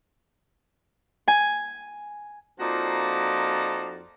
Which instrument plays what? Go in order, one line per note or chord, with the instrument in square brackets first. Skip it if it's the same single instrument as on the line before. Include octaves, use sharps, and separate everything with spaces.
[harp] G#5
[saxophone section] F2 F3 A#3 D#4 F#4 D5